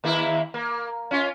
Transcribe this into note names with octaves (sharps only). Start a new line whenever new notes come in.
D#2 A#3 E4
A#3
C#4 F4